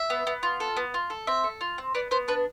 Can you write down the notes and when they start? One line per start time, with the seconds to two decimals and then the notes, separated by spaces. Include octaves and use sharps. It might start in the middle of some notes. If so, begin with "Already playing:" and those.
Already playing: E5
0.10 B3
0.27 B3
0.43 F4
0.60 A4
0.77 B3
0.94 F4
1.10 A4
1.27 C4 E5
1.44 A4
1.61 F4
1.78 C4
1.95 B3 D5
2.11 B3 C5
2.28 D4 B4